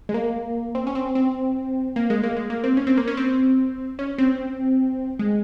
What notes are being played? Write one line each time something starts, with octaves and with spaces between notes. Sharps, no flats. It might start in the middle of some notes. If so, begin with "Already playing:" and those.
G#3
A#3
C4
C#4
C4
C4
A#3
G#3
A#3
G#3
A#3
C4
C#4
C4
A#3
C#4
C4
C#4
C4
G#3